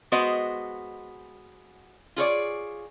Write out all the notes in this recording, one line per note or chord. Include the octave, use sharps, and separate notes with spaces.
G#3 B3 F#4 C5 D#5
F4 G#4 C#5 D5